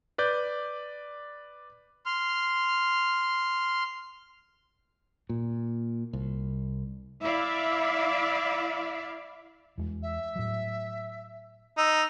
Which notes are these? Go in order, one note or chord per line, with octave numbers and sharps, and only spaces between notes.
B4 D5 G6
C6 F6
A#2
C2
E4 D5 E5 F5
E2 G#3
E5
A2 F#3
D#4 E6